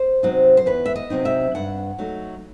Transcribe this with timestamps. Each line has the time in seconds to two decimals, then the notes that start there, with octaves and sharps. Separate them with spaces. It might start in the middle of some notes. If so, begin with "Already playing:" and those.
Already playing: C5
0.23 C3 F#3 C4 D#4
0.57 C5
0.66 E2 B4
0.86 E5
0.96 D#5
1.10 C3 F#3 C4 D#4
1.25 E5
1.55 G2 F#5
1.99 F#3 A3 D#4